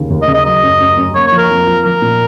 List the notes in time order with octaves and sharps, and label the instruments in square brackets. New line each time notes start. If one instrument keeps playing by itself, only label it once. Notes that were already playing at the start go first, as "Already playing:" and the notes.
Already playing: [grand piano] D#2 C#3
D#2
[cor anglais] D#5
[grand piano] C#3
[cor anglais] D#5
[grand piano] F#3 [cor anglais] D#5
[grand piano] F#2
F#2
F#2
[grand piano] A#3 [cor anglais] C#5
[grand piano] F3 [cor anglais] C#5
[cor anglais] A#4
[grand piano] F2
F3
[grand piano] F3 [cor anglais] A#4
[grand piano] A#2